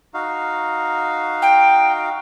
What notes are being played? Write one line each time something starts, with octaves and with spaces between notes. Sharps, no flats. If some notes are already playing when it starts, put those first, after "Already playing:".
D#4 F#4 F5
G5